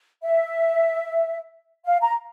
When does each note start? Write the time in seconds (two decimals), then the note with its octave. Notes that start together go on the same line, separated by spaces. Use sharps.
0.23 E5
1.86 F5
2.02 A#5